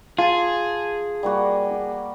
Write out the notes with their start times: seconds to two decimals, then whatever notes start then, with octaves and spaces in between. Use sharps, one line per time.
0.18 F4 G#4 A5
1.23 G3 A#3 F#4